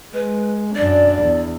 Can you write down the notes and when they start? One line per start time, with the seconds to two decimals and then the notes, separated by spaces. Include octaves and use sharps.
0.14 G#3 B4
0.76 F#2 D4 D5
1.23 E2